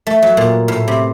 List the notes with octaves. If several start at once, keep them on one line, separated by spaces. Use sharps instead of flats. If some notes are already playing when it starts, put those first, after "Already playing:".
A3
F#3
A#2
A2
C3